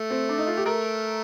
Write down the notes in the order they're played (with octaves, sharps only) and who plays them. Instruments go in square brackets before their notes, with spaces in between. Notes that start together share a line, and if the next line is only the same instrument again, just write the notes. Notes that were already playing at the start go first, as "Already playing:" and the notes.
Already playing: [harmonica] A3
[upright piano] C4
D4
D#4
F4
G4
[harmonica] A3 [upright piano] A#4